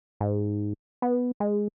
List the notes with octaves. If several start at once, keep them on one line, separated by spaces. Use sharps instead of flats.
G#2
B3
G#3